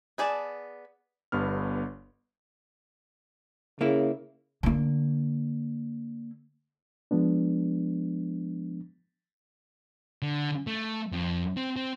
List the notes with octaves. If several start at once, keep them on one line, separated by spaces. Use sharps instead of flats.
B3 G#4 D5 A5
G1 G2 B3 F6
C#3 A#3 E4
D3 A#3
F3 G#3 B3 D4
D3
A3
F2
C4
C4